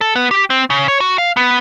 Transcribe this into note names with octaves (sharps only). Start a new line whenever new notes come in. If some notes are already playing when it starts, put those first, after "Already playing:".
A4
B3
G4
C4
C#3
C#5
F#4
F5
B3